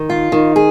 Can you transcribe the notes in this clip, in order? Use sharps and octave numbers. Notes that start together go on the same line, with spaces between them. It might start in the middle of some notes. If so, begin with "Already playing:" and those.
Already playing: D#3
F4
D#3
G#4